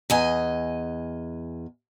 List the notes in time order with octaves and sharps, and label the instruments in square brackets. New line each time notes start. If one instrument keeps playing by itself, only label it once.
[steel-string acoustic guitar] E2 D#5 G#5